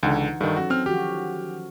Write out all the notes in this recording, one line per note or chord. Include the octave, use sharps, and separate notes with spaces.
C#2 D3 E3 D#4 F#5
G2 D#3 A4
F#3 C#4 F#4
C4 F6
D#3 F3 F#4 G4